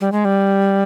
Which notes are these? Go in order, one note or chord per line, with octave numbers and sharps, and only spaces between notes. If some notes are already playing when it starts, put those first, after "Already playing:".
G3
G#3
G3